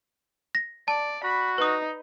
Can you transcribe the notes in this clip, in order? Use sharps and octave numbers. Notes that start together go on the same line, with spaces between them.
A#6
D5 A5
F#4 B5
D#4 B4 D#6